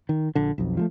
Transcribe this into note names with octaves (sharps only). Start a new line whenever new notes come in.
D#3
A#1 D3
B1 F2
F3 G3 A3